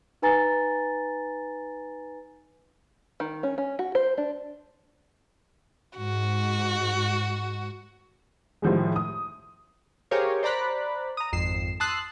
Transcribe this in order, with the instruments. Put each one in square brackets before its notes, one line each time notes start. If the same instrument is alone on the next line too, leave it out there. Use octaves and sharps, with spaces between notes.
[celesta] D#4 B4 G#5 A#5 A6
[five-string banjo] D#3
C#4
C#4
F#4
C5
D4
[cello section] G#2 [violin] F#4
[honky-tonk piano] A2 D#3 F3 G3 G#3
D#6
[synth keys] G4 G#4 A#4 C5 C#5 F5
C5 D5 A#5 B5 F#6
A#5 D#6
G#1 F2 C7 E7
A5 C6 D#6 E6 F#6 C7